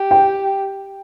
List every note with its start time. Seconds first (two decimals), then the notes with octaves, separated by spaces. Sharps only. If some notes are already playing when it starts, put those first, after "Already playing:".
Already playing: G4
0.11 G5